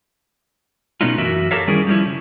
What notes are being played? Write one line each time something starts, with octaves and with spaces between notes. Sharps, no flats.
B2 A3 B3 C#4 D#4 F4
F#2 E3 F#4 A#4 E5
G4 A4 A#4 C#5 E5 F5
D#3 G3 C#4 E4 G#4 A#4
F3 G3 G#3 C#4 E4
C#3